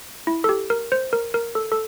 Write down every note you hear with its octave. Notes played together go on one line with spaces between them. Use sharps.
E4
A4
G4
A#4
C5
A#4
A#4
A4
A4